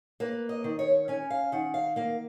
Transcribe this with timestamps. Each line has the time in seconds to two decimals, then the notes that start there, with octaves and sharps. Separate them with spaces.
0.20 A#3 B4
0.49 D#5
0.64 D#3
0.79 C#5
1.08 C#4 G#5
1.30 F5
1.52 D#3 F#5
1.74 F5
1.96 A#3 F5